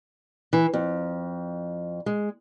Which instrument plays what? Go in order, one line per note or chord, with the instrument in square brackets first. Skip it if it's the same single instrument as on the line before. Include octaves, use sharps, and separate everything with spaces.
[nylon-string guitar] E3
F2
G#3